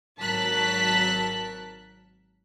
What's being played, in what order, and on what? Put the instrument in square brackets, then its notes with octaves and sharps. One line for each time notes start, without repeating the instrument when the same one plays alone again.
[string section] G#1 F#3 A#4 A5 F#6 B6